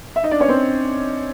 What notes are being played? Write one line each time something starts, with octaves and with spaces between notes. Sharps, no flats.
E5
D#4 D#5
D4 D5
C#4 C#5
C4 C5